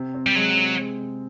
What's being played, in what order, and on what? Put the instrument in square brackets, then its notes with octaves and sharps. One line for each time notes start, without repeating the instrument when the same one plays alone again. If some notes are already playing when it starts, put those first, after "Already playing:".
Already playing: [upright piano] C3
C4
[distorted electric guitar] G3
[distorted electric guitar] F#3 [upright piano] G#3
[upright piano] C3
G#3
C3